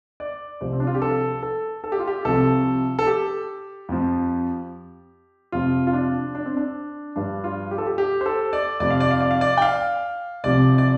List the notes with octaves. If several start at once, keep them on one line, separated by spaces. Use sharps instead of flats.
D5
C2 C3 F3 C5
C4
D4
F4
G4
A4
A4
A4
G4
F4
G4
C2 C3 F3 A4
A4
G4
F2 F3
F2 C3 F3 F4
F4
D4
D4
C4
D4
G2 F3 D4
F4
G4
A4
G4
G4
C5
A4
D5
F2 C3 F3 D5
F5
D5
F5
D5
F5
D5
G5
F5
C2 C3 F3 D5
D5